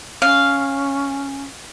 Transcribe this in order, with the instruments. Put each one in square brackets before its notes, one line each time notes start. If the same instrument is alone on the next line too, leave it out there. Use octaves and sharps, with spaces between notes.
[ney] C#4 [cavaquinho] F5